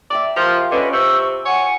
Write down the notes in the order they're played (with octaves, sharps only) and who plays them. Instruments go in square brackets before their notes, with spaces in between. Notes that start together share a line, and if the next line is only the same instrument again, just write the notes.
[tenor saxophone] D5 [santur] E5 G5 A#5
[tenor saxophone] F3 [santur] F4 G4 A#4
[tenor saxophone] D3 [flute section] C#4 B4 D#5 [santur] D6
[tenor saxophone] C3 [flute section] C#6 E6
[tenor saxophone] C#5 [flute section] F#5 G#5